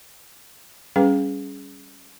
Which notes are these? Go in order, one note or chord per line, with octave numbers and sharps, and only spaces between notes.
G3 C#4 G#4 B4 G5